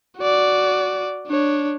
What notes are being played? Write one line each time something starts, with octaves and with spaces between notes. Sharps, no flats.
F#4 D5
D4 C#5